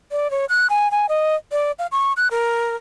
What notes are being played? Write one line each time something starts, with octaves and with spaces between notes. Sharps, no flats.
D5
C#5
F#6
G#5
G#5
D#5
D5
F5
C#6
F#6
A#4